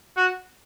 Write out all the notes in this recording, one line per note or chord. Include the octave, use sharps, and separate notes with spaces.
F#4